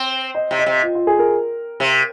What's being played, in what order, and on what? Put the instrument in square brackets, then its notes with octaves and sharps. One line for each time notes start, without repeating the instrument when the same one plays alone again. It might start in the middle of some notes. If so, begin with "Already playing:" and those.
Already playing: [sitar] C4
[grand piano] D#5
[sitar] C3
[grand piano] D#5
[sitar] C3
[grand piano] F4
F4
G#4
A#4
[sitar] C3